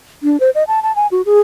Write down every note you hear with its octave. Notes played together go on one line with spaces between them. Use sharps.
D4
C5
D#5
A5
A5
G#5
F#4
G#4